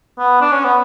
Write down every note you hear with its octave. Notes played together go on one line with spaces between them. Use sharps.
B3
D4
C#4
B3